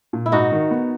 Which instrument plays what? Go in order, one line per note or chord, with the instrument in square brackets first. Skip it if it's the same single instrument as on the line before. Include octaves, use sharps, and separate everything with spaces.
[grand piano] A#2
[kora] E4
[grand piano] G#2 [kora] D#4 F#4
[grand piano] D#3
B3